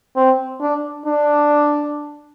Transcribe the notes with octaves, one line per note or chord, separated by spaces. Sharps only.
C4
D4
D4